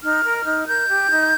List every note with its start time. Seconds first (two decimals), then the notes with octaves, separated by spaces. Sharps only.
0.02 D#4 F6
0.23 A#4
0.45 D#4
0.67 A#4 G6
0.88 G4
1.10 D#4